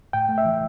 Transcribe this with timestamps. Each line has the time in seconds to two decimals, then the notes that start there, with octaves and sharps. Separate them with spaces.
0.13 A2 G5
0.29 A3
0.38 E5
0.45 E3